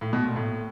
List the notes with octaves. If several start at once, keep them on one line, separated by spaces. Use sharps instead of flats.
A2
B2
A#2
A2